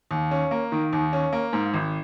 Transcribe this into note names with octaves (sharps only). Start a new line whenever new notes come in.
D#2
C#4
A#3
D#3
D#2
C#4
A#3
G#2
G#1